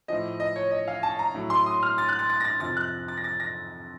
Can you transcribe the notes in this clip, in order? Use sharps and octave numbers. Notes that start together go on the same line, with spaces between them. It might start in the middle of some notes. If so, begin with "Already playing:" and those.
A2 F3 D#5
D#5
C#5
D#5
F5
A5
A#5
A2 F#3
C6
D#6
F6
A6
F#6
A6
A6
A#6
A6
F2 C3 F3 A6
F#6
A6
A#6
A6
A#6